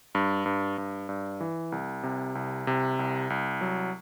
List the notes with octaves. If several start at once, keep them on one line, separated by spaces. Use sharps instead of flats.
G2
G2
G2
G2
E3
C2
C3
C2
C3
C2
C2
F#3